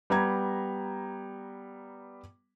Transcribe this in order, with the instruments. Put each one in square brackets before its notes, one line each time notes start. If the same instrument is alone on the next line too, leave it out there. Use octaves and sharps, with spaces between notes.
[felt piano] G3 B3 A#5 G#6